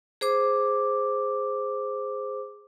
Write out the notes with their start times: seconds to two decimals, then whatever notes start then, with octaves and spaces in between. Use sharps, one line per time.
0.21 G#4 C5 D6